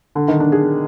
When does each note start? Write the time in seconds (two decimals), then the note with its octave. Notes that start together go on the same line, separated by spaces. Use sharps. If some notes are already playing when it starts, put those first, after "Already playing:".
0.15 D3
0.28 D#3
0.40 D4
0.52 G#4